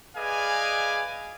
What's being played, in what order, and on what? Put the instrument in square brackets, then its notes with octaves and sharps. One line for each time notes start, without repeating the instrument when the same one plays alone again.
[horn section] G#4 B4 D5 D#5 F5 G#5